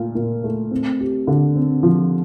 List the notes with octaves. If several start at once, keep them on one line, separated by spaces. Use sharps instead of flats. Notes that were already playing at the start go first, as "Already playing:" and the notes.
Already playing: A#2 A3 F4
A#2
A3
C4
G4
D3
C4
F3